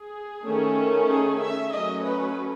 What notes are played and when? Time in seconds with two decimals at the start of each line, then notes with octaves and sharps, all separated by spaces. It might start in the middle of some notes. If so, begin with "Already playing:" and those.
Already playing: G#4
0.46 D#3 A3 C#4
1.09 G#4
1.42 E5
1.73 F#3 A3 C#4 D#5
2.05 B4